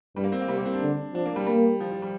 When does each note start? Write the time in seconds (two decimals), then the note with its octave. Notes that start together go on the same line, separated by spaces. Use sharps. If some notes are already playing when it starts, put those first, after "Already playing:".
0.16 G2 G3
0.24 A#3
0.32 C4
0.41 A#3
0.48 C3 G3
0.57 A#3
0.65 C4
0.74 D4
0.82 D3
1.14 F3 D4
1.26 A#3
1.36 G3
1.46 G3 A#3
1.80 F3
1.91 F3
2.02 G3